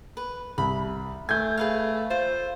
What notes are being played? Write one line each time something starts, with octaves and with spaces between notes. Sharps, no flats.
B4
C2 B5
A3 G#5 G6 G#6
G#4 B4 F5
F4 C5